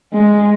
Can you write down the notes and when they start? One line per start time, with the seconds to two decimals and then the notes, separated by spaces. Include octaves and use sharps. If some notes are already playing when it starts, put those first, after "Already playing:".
0.14 G#3